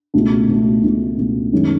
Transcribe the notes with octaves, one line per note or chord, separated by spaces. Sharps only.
C#2 B2 A3
C#2 B2 A3
C#2 B2 A3
C#2 B2 A3
F#2 D#3 G#3 C#4